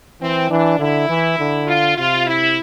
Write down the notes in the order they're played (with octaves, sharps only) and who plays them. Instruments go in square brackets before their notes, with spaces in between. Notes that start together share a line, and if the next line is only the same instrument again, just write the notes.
[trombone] E3 [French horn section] C4
[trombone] E3 [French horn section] D4
[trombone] D3 [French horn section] E4
[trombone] E3
D3
[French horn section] F4
[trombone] C3 [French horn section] F4
[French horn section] E4